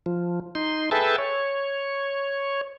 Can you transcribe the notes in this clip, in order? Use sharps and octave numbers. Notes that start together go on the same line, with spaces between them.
F3
D#4 C6
G#4 A4 B4 E5 G5 A5
C#5